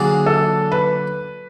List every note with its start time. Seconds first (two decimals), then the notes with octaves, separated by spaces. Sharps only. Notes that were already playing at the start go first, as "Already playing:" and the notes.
Already playing: D3 F#3 A#3 D4 G#4
0.26 A4
0.72 B4